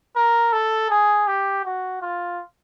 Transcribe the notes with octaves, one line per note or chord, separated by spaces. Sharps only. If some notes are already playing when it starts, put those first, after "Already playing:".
A#4
A4
G#4
G4
F#4
F4